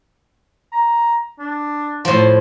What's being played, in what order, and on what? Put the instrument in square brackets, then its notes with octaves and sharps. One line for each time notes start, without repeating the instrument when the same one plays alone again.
[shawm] A#5
D4
[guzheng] A2 F3 [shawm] C5